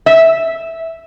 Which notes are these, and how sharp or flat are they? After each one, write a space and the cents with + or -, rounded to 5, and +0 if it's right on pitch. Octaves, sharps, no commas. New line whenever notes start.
E5 -5